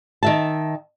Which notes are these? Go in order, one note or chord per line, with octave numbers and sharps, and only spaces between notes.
D#3 E5 A5